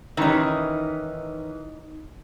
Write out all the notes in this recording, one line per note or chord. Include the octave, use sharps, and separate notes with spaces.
D#3 E3 C#4 D#4 D#5